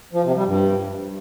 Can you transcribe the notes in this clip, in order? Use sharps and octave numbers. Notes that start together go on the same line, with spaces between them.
F3
C3
G3
G2